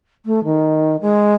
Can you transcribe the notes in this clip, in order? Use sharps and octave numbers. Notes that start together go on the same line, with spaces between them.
A3
D#3
G#3